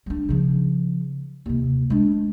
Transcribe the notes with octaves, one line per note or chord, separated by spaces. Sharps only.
G3 D4
C#3 F3
D#2 C3
G#3 D4